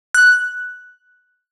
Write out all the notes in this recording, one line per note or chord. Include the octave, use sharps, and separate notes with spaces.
F#6